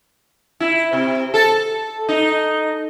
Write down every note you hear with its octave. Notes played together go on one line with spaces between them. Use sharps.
E4
C3
A4
D#4